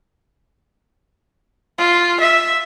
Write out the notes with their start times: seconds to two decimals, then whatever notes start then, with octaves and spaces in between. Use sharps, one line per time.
1.78 F4
2.20 E5